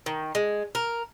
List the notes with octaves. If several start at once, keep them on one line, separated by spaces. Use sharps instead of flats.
D#3
G#3
A#4